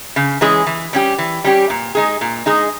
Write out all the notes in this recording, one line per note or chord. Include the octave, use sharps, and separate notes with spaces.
C#3
E3 G#3 C#4 G#4
E3
G3 C#4 G4
E3
G3 C#4 G4
A#2
G#3 D#4 G#4
A#2
G#3 D#4 G#4